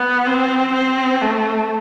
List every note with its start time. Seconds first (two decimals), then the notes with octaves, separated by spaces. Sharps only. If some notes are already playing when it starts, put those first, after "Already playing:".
Already playing: B3
0.27 C4
0.74 C4
1.22 A3